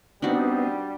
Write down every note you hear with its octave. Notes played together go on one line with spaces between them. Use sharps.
G3 B3 C4 D4 D#4 F#4